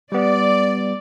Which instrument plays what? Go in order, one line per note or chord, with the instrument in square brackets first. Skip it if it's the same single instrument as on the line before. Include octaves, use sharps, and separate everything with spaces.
[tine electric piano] G3 B3 [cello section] D5